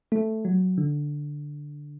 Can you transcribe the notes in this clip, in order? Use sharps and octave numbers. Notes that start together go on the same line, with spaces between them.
A3
F#3
D3